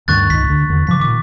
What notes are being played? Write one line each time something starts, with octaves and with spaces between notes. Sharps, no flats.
D2 G2 D#3 C#6 F#6 A6
C#2 G#2 B6
D2 D3
E2 D3
G#2 C#3 F3 D6 B6
A#2 D#3 D6 B6